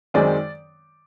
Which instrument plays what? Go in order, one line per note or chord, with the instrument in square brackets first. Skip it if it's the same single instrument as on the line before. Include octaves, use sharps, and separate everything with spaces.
[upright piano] F#2 D#3 G#3 C4 D5